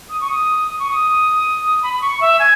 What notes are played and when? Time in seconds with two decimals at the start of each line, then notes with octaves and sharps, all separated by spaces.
0.10 D#6
0.21 C#6
0.30 D#6
0.68 D#6
0.79 C#6
0.91 D#6
1.83 B5
1.94 B5
2.02 C#6
2.21 E5
2.39 G#5